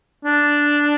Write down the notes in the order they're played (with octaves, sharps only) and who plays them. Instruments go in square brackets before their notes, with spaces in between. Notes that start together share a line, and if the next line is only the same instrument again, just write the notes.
[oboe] D4